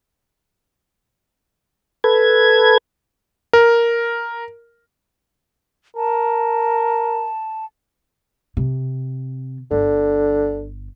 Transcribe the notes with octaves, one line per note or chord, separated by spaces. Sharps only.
A4 B4 G#6
A#4
A#4 A5
C3
G1 D3